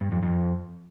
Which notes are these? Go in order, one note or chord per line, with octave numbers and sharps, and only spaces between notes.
G2
F2
F2